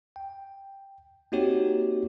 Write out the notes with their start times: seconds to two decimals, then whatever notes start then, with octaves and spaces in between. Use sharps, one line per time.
0.16 G5
1.32 A#3 C4 D#4 F#4 G4 C#5